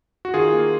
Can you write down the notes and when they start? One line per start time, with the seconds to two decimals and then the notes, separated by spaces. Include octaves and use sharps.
0.25 F#4
0.34 D#3 F4 G#4
0.53 A#3